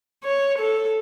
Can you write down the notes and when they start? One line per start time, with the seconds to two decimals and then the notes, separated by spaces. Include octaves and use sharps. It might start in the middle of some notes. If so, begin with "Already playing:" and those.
0.25 C#5
0.59 A4